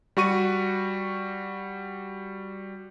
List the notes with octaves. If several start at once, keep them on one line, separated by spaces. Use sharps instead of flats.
G3 F#4 C#6 D#7